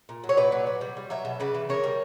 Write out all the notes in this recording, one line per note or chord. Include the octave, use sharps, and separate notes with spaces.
A#2
F#3
C#5
A#2 B4 D5
F#3
F#3
G3
G3
F#3 C#5 E5
B2
C#3 B4 D5
E3
C#3 A#4 C#5
G3